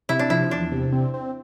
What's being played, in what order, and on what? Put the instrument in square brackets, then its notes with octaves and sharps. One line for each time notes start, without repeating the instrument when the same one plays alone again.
[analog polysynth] C3 [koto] E4
[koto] D4
[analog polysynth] F3 [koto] E4
[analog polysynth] E2 [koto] D4
[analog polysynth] C3
C4
C4